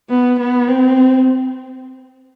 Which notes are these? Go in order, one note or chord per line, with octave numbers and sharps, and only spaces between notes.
B3
B3
C4